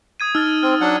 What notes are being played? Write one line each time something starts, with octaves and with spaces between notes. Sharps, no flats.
D#6 G#6 D#7
D#4 E6 F6 A6
C4 F6
F#3 D4 F#5